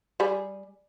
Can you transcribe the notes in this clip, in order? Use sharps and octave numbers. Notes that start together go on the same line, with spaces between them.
G3 G#4